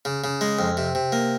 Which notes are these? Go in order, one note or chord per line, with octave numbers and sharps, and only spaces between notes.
C#3
C#3
G#3
F2
C3
C3
A#3